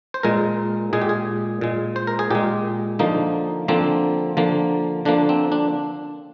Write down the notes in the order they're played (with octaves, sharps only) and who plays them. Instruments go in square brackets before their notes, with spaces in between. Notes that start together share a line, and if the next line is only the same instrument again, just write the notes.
[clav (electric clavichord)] C5
A#2 G#3 A#4
A#2 G#3 G#4
G4
G#4
A#2 G#3
C5
A#4
G#4
A#2 G#3 G4
D3 F3 A#3 D#4
D3 F3 A#3 C4
D3 F3 A#3
D3 F3 A#3 D4
C4
D4